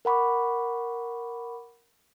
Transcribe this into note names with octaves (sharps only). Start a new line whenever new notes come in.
A#4 F#5 B5 C#6 D6